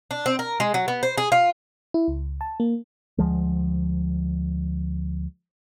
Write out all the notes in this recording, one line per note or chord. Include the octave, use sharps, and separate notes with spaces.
D4
C4
A#4
G#3
F#3
B3
C5
G#4
F4
E4
C#2
A5
A#3
D2 F3 G#3